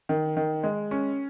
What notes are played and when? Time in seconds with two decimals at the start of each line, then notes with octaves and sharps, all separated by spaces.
0.09 D#3
0.37 D#3
0.63 G#3
0.91 C#4